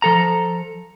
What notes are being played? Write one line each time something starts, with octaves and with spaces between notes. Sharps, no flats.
F3 A4 A#5